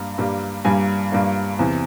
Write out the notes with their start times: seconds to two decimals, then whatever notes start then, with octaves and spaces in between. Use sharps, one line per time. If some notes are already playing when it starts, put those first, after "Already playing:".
Already playing: G2 G3 A#3
0.18 G2 G3 A#3
0.65 G2 G3 A#3 G#5
1.12 G2 G3 A#3
1.59 E2 C3 E3